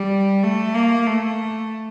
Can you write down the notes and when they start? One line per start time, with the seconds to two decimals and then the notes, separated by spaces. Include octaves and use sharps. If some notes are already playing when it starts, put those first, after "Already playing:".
Already playing: G3
0.43 A3
0.75 A#3
1.07 A3